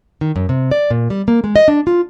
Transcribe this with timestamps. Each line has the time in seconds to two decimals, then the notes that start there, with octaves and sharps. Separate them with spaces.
0.21 D#3
0.36 F#2
0.49 C3
0.71 D5
0.90 A#2
1.10 G3
1.28 A#3
1.44 G#3
1.56 D#5
1.68 D4
1.87 F4